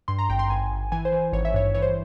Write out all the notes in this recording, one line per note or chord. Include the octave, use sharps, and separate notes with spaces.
G2 C6
A#5
G#1 G5
C6
G#1 G#5
G#1
E3 G#5
C5
E3
G#1 C#5
E5
G2 C#5
E3 C#5
C5